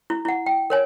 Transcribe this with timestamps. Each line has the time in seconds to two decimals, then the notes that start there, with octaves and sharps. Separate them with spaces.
0.10 E4
0.25 E4 F#5
0.46 G5
0.70 A#4 C#5 G#5